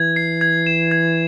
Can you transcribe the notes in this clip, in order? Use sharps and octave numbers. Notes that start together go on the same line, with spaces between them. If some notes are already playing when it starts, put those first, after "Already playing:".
Already playing: E3 G#6
C7
G#6
E7
G#6